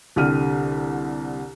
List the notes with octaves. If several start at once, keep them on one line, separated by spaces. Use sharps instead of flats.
C2 D3 G4 F6 D#7